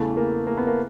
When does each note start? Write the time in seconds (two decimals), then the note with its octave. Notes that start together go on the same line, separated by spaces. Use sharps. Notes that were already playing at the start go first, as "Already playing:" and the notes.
Already playing: E2 C#3 E3 A3
0.17 A#3
0.47 A#3
0.57 B3
0.67 A#3